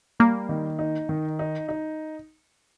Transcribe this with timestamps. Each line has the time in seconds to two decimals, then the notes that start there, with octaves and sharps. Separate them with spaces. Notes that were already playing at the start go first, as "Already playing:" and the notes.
0.19 G3 A#3
0.49 D#3
0.79 D#4
1.09 D#3
1.39 D#4
1.69 D#4